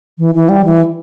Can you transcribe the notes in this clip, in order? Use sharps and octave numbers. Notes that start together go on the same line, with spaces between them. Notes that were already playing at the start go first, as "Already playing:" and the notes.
E3
E3
G3
E3